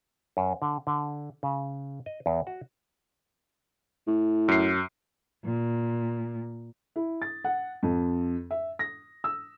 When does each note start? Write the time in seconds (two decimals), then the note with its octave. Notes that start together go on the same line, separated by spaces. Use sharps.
0.37 F#2
0.62 D3
0.87 D3
1.43 C#3
2.06 D#5
2.26 E2
2.47 F#4
4.07 A2
4.48 F#2 C7
5.44 A#2
6.96 E4
7.22 A6
7.44 F#5
7.83 F2
8.51 E5
8.79 A#6
9.24 E6